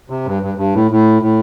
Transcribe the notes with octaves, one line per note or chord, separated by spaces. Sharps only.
C3
G2
G2
G2
A2
A2
A2